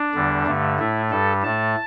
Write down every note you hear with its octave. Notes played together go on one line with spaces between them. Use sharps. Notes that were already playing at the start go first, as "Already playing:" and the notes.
Already playing: D4
E2 D3 G3
G2 D3 A3
A2 A3 E4
G2 G3 A4
A2 A3 A5